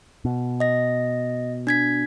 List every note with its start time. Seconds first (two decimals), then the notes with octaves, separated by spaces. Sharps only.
0.25 B2
0.60 D#5 A#6
1.67 D4 G#6 B6